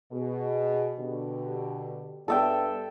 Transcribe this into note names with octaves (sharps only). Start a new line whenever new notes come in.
B2 G#4
B2 D3 G4
G2 B3 A4 D5 E5 G5